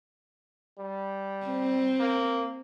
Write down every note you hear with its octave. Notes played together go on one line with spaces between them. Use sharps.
G3
C4
A#3